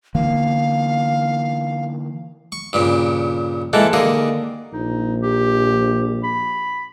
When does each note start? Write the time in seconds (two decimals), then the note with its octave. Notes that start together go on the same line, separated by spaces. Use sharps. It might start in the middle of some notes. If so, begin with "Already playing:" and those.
0.15 D3 E3 A#3 F5
2.52 C#6
2.73 G2 A#2 C#3
3.73 E3 G#3 A#3 A4 F#5
3.93 D#2 D3 A#3 G#4
4.73 A#1 D#4
5.22 G4
6.23 B5